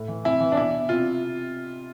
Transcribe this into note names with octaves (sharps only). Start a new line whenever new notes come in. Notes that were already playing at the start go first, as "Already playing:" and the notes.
Already playing: A2
E3
C3 E4
E3
D4
B2 E4
C3 F4